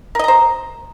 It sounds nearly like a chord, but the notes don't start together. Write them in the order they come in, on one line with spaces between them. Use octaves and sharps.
A#4 D#5 A#5 C5